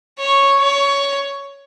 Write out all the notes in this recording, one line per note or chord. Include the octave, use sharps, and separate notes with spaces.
C#5
C#5